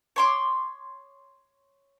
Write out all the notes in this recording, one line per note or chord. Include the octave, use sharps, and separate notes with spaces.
C#5 C6 D6